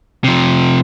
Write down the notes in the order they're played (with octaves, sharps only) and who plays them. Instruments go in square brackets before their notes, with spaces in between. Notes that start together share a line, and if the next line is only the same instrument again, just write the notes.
[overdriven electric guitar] C3 F3